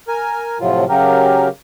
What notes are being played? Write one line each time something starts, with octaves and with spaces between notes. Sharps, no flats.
A#4 G#5
A2 C3 F3 F#3 F4
C#3 F#3 G4 A#4